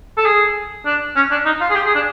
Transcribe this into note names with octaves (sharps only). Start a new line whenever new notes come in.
A4
G#4
D4
C#4
D4
D#4
F4
G#4
G4
G#4
D4